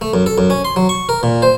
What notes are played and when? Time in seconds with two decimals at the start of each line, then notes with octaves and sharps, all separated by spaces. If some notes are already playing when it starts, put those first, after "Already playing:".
0.01 A3
0.14 F#2
0.26 A4
0.38 F#2
0.50 C#4
0.65 C6
0.76 F#3
0.89 C#6
1.09 A#4
1.23 A#2
1.42 C5